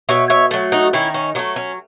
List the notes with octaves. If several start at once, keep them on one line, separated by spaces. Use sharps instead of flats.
B2 C#5 E5
C#5 E5
F#3 A3
D#4 F#4
D#3 C#4 E4
C#4
F#3 A3 B3
C#4